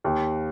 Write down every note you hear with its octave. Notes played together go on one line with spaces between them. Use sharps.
D#2